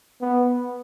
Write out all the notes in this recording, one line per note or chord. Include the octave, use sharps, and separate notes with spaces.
B3